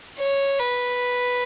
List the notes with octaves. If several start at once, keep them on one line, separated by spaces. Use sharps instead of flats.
C#5
B4